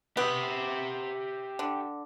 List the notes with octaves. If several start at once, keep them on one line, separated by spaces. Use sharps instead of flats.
B3 G4 E5
D3